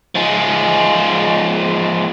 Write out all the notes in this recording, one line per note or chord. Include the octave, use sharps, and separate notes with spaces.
F3 G#3